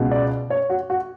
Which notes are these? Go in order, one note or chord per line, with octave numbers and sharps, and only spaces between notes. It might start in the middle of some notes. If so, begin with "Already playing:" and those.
Already playing: C#2 B2 G#3
D5
C#5
F#4
F#4